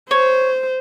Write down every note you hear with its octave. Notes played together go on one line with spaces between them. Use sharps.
C5 C#5